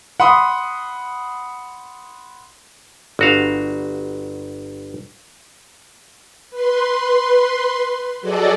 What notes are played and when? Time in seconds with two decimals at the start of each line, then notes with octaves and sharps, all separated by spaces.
0.20 F#5 B5 C6 D#6
3.19 G1 F#4 F5
6.50 B4 C6
8.21 F#3 F#4 G#4 A4 D5 D#5